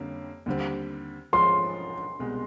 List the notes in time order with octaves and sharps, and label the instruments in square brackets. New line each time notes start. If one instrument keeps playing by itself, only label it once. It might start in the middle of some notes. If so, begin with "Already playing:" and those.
Already playing: [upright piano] F2 D3 G3 A#3 C#4
D#2 D3 G3 C4
[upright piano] G#2 F3 G#3 C#4 F4 [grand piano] C6
[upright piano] C2 B2 G#3